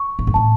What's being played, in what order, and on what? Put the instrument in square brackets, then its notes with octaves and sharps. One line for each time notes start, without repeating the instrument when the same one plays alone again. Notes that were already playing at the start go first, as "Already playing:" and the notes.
Already playing: [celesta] C#6
[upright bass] A2
F#2
[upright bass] A2 [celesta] A5